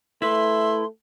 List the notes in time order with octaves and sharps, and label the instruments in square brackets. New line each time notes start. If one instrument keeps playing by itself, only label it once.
[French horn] A3 [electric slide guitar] E4 B4 [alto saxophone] E5 [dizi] C6